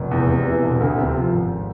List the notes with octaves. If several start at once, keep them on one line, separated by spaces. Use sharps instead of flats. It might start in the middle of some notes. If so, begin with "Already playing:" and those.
Already playing: F1
E2
C3
E3
E1
D2
C3
F3
G#1